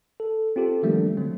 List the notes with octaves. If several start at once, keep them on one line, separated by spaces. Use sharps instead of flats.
A4
C4 F4 G4 A4
D#3 F3 G3 A3 A#3 D4
D3 F#3 A3 C4